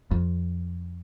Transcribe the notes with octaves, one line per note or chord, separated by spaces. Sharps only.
F2